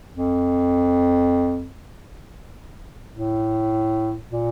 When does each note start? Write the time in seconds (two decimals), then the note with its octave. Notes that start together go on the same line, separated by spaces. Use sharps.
0.13 F2
3.11 A2
4.30 A#2